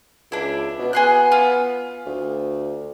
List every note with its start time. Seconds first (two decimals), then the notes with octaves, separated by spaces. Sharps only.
0.32 C#2 D4 E4
0.79 B2
0.93 B3 G#4 C6 F#6
1.32 F4
2.06 D2